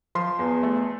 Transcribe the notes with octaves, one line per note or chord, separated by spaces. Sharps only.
F3 C6
E2
A3